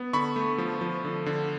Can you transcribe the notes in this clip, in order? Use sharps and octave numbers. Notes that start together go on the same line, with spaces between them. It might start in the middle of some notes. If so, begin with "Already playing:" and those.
Already playing: B3
D3 B5 C#6
A3
F3
F3
D3
D3